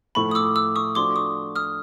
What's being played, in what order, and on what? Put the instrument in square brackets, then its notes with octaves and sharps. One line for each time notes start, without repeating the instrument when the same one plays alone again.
[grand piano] A2 F3 A3 [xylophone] B5 C#6
[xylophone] D#6
D6 E6
D6 E6
C#6 D#6
[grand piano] F3 A3 D4 F#4 A4 [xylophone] C6 D6
[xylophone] C#6 D#6
D#6 F6